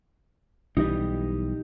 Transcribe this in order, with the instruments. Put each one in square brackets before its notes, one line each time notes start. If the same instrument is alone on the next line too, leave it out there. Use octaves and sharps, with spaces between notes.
[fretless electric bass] B1 E3 G3 [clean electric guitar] D#4 G4 D#5